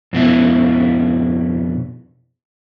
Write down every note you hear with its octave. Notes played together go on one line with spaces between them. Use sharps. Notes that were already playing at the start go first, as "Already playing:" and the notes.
F2 B2 E4